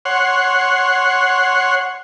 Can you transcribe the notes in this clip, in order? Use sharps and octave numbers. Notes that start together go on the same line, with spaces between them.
C#5 F#5 C6